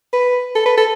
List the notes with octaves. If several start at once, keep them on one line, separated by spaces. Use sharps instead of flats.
B4
A4
B4
A4